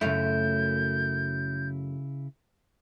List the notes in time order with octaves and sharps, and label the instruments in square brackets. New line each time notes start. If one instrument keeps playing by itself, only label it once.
[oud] F#2 A3 F4 [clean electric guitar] C#3 E4 [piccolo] G6